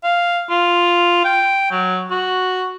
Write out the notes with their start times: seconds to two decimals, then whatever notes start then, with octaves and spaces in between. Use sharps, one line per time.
0.03 F5
0.50 F4
1.24 G5
1.71 F#3
2.11 F#4